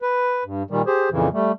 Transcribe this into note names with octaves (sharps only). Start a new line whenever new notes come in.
B4
G2
A#2 D#3 G3
G4 G#4 C5
F2 A#2 C#3 E3
G3 A3